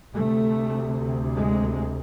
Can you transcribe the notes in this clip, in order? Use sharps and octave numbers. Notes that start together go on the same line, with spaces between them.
D2 C3 A3
G#3